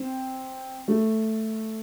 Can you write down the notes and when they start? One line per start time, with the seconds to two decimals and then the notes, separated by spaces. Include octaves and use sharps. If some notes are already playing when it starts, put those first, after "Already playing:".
Already playing: C4
0.88 A3